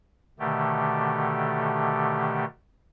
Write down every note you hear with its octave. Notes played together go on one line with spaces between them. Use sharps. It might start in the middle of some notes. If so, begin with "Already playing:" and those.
B2 D3 D#3 A3 G4